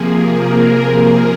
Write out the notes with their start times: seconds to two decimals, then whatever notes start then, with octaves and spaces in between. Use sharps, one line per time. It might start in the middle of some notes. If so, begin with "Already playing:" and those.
Already playing: C3 F3 A#3 G#4
0.30 A#4
0.75 A#4